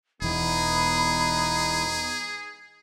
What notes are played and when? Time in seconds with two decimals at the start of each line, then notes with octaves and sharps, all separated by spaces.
0.22 E1 E3 B3 D#4 G#4 B5